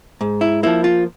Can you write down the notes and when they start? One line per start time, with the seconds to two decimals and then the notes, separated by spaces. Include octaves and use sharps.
0.21 G#2
0.41 E4
0.63 F3 A#3 E4
0.84 F4